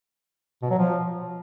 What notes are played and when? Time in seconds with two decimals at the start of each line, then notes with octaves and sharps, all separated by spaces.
0.62 B2
0.70 F#3
0.78 F3